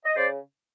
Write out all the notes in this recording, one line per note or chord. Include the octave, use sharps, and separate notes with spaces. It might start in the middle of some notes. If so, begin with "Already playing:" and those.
D#5
C#3 C5 D5